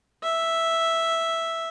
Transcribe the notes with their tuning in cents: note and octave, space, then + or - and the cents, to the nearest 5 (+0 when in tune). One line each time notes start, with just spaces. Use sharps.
E5 +0